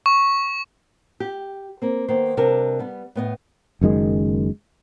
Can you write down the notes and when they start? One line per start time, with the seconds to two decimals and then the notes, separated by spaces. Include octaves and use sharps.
0.06 C#6
1.20 G4
1.82 A#3 C4
2.08 D#3 A#3 B3 C5
2.37 C3 G3 D4 A#4 B4 A5
2.79 G3 B3
3.15 A2 B3 D#5
3.81 F#1 F#2 D#3 G#3